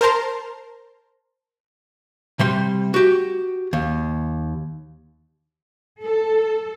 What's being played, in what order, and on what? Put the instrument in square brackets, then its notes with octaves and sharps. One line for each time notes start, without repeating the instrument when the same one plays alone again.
[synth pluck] A#4 C5 A5 A#5 C6
[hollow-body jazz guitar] C3 G3 C6
F#4 G4
D#2
[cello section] A4